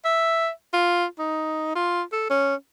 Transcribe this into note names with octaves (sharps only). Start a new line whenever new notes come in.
E5
F4
D#4
F4
A4
C#4